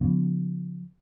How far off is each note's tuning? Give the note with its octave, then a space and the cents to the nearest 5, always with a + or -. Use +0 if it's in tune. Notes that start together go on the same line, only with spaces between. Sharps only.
D3 -45 F3 +30 B3 +0